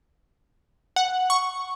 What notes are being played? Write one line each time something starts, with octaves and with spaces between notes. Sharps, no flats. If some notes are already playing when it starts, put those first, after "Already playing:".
F#5
C#6